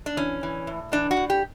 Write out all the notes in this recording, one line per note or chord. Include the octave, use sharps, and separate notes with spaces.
D4
E3 C#4
E3
A2
E3 D4
F#4
A2
G4